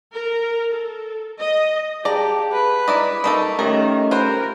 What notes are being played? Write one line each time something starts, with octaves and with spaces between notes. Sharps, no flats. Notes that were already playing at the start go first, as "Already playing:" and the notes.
A#4
A4
D#5
G4 G#4 D5 F5 A5 A#5
B4
E4 D5 D#5 A#5
A#3 D#4 A4 D#5 E5 B5 C#6
D#3 A3 C#4 G4 A#4
F4 A#4 C5 G5 B5 F#6